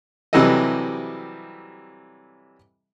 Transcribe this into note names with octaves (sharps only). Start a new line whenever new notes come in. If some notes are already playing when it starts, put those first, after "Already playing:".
C3 E3 F#3 G3 A4 D#5